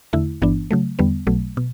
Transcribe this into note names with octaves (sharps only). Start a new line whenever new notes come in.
E2 D3 A3 E4
G1 G2 E3 B3 D4
C#3 F#3 A3
E2 D3 G3 B3
B1 B2 F#3 A3
B2